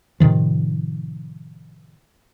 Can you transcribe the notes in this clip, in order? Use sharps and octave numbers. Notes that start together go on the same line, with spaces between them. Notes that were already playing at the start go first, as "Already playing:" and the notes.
A2 C3 D#3 F3